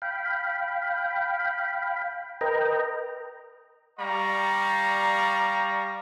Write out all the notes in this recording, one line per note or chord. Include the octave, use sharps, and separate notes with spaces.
F5 G5 B5
A#4 B4 D#5 G5 A#5
G3 D5 F5 A#5 C#6